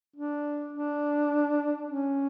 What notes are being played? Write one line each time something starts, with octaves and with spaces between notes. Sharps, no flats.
D4
D4
C#4